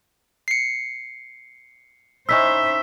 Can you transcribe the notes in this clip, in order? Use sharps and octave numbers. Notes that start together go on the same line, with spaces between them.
C7 C#7
C#4 D#4 E4 C5 E5 E6 B6